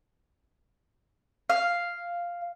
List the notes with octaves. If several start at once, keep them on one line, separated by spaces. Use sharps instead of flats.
F5